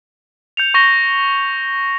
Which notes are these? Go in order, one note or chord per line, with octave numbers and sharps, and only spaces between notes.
G6 C#7 F7
C#6 A#6 G7